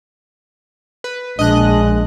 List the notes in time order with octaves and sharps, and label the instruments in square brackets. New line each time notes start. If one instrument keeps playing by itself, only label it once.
[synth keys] B4
[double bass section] A#1 [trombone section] G#3 [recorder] D4 [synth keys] D#5 F#6